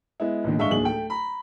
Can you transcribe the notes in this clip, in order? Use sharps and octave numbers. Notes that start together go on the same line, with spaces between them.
G#3 B3 E4
A1 A#2 D3 D#3
G1 G#3 E5 F5 C#6 G7
D1 D#2 G#4 F#7
A3 G5
A#5 B5